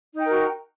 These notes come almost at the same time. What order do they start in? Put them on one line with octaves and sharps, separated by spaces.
D#4 G5 A#4 F#4